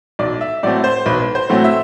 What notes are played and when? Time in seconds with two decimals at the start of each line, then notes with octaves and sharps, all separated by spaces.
0.19 B1 D5
0.41 E5
0.63 A2 F#3 A3 C4 D5
0.84 C5
1.06 B1 B4
1.35 C5
1.49 A2 F#3 A3 C4
1.64 E5